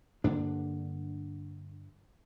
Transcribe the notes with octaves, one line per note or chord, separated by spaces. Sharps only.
G2 D3 A#3 D4